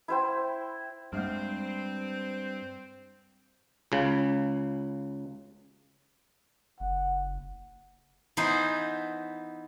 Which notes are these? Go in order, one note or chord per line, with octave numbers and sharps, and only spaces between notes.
E4 C5 G5
G2 G3 G#3 A#3 C4
C#2 C#3
F#1 F#5
E3 B3 D#4 E4 B4 C5